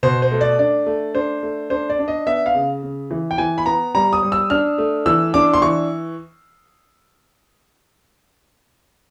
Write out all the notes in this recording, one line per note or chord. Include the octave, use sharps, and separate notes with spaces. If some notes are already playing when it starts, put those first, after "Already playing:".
B2 C5
C5
A3
D5
D4 D5
A3
D4 C5
A3
D4 C5
D5
D4
D#5
B3 E5
F5
C#3
C#3
E3
G5
E3 G#5
B5
B3 A#5
G3 A#5
D#6
G3
E6
D4 F6
A3
E3 E6
D4 D6
C6
E3 C#6